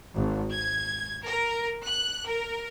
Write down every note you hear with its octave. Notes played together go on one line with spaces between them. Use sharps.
G#1
G#6
A#4
F#6
A#4